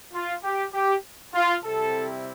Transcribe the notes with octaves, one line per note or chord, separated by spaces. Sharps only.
F4
G4
G4
F4
C3 G3 C4 E4 A4